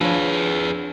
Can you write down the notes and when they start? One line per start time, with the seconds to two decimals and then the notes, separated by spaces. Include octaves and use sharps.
0.01 F3 D4 G#4 B4 C#5